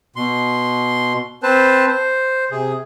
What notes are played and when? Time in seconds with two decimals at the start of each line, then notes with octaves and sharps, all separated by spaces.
0.16 B2 C6
1.43 C4 B4 C5 A5
1.88 C5
2.51 C3 G#4